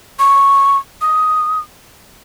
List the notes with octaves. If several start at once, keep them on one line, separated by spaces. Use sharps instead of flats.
C#6
D#6